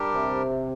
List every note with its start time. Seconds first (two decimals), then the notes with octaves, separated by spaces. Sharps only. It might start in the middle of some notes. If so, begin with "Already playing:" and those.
Already playing: G3 D4 G4 A#4
0.14 C3